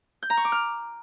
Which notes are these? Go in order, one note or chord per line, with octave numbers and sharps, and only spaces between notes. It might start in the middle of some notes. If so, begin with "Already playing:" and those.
G6
A#5
C#6
D6
F6